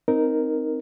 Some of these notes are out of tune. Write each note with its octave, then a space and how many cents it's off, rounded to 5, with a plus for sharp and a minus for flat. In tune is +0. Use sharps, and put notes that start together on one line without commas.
C4 +0 D#4 +0 A#4 +0